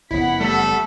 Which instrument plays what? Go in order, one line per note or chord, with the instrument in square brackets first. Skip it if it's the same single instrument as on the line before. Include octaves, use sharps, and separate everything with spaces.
[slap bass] F#1 F2 B3 [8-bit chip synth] E4 [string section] F#5 B6
[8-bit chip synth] G3 A3 [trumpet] A4